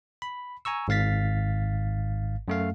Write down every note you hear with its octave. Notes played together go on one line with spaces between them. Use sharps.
B5
G#5 A#5 C#6 E6
G#1 G#2 F5 A6 B6
F#2 A3 F5